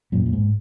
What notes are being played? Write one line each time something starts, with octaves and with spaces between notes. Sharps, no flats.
F#2 A#2
F#2
G#2